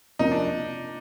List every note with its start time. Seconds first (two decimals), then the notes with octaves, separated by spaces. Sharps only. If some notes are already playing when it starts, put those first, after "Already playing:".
0.19 C3 F3 A#3 C#4 D#4 F4
0.32 D4